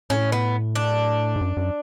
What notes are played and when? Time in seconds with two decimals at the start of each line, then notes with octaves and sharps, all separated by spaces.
0.10 A2 C#4
0.32 B3
0.75 D4
1.36 G#2
1.41 F#2
1.57 F#2